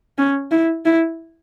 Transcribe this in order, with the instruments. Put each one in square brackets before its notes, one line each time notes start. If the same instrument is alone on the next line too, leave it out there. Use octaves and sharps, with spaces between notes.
[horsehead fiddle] C#4
E4
E4